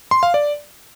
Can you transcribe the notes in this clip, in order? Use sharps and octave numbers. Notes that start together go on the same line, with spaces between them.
C6
F5
D5